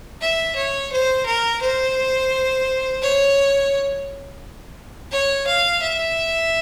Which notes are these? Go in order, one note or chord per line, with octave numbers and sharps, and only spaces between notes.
E5
C#5
C5
A#4
C5
C#5
C#5
F5
E5